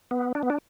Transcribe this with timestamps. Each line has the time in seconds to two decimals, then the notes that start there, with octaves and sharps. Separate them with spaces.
0.11 B3
0.35 D4
0.43 B3
0.50 D4